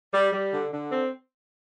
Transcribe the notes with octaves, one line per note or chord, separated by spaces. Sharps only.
G3
G3
D3
D3
C4